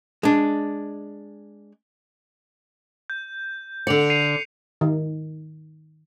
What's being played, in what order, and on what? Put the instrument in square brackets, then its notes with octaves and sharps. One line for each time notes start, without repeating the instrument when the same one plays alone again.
[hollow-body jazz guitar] G#3 D4
[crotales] G6
[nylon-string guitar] D3 D5 [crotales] C#7 F7
[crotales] C7 D#7 F7
[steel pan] D#3